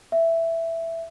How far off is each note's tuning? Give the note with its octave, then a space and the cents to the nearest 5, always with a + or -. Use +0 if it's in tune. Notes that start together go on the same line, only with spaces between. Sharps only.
E5 +5